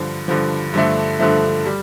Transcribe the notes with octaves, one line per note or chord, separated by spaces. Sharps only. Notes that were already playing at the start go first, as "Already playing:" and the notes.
Already playing: G2 D3 F3
G2 D3 F3
G2 D3 F3 A3
G2 D3 F3 A3
G3